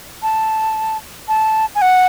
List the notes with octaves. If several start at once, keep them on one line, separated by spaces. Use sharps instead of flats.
A5
A5
G#5
F#5